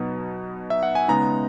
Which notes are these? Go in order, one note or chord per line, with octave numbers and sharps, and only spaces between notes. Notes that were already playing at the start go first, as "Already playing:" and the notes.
Already playing: B2 F#3 B3 D#4
E5
F#5
G#5
C#3 G#3 B3 D#4 A#5